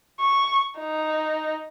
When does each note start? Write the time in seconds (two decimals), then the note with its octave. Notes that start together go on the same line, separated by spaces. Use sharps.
0.21 C#6
0.78 D#4